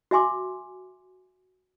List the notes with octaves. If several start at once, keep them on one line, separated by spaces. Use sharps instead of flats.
F#4 E5 G#5 C6 D6